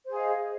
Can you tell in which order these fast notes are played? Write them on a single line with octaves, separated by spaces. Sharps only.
C5 G#4 F5 D#5